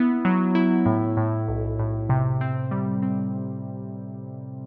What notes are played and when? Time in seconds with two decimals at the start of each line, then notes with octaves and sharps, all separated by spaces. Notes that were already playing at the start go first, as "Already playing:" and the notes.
Already playing: B3 E4
0.25 F#3
0.55 E4
0.86 A2
1.17 A2
1.48 B1
1.79 A2
2.09 C3
2.41 C4
2.71 G3
3.03 C4